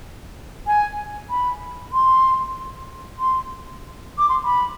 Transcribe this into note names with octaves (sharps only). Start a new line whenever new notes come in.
G#5
B5
C6
C6
D6
C6
B5